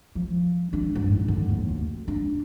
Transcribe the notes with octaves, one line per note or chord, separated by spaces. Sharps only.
F3
D4
G2
G#2
D3
D#2
D2
D4